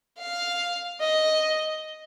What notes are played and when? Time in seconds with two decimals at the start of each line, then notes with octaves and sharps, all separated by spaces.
0.18 F5
1.01 D#5